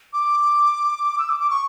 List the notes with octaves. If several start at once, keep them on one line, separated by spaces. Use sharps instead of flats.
D6
E6
D6
D6
C#6